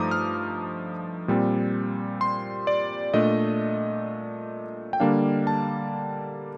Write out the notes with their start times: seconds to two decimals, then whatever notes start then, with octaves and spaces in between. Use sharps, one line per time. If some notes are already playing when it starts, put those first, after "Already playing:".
Already playing: G2 F3 A3 D#4 A#5 D6 D#6
0.11 F6
1.28 A#2 G3 C4
2.21 C6
2.67 D5
3.14 A#2 A3 D4 D#5
4.93 G5
5.00 D3 G3 A#3 D4 F5
5.47 A5